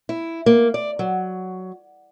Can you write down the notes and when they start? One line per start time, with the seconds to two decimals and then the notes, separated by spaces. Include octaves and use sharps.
0.09 E4
0.46 A#3
0.74 D5
0.99 F#3